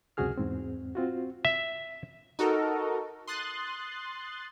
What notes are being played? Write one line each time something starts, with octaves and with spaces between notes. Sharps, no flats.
C#2 F#2 C3 F#4 G#4 F6
E2 G#2 C4
C4 F4 F#4
E5
D#4 F#4 A4 A#4
C6 D#6 F#6 A6